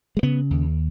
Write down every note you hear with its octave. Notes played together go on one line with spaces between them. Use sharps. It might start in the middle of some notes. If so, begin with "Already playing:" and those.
G#3
C#3 B3
D#2